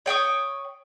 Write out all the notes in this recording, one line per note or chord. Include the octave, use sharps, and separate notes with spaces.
C#5 G5 C#6 D#6